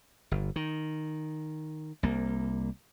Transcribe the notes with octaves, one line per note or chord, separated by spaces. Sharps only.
G1
D#3
C2 A#3